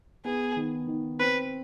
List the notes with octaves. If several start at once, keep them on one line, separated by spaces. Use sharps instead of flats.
B3 G#4
D#3
D#3
C4 B4